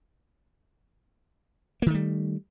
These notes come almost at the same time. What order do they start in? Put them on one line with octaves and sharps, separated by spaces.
A#3 D#3 A3 G3